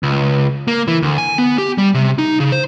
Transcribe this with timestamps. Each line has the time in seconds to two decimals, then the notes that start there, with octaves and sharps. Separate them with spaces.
0.03 C#2
0.68 A#3
0.88 E3
1.02 D2
1.18 G#5
1.38 B3
1.58 G4
1.78 G3
1.94 C3
2.18 D#4
2.40 C#3
2.52 C5